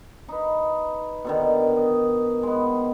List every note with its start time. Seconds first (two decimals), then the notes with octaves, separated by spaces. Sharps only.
0.28 D#4 B4
1.25 B2 D3 D#3
1.76 D#5
2.43 G#3 B3